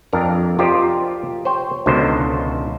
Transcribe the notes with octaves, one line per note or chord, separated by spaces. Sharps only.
F2 D4 A#4 A#5
F4 G4 A#4 C5 D5 D#5
C5 C#5 G5
C#2 B2 D3 D#3 C5